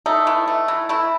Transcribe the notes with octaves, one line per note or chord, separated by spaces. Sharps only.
A3 D#4
E3
A3
E3
A3 E4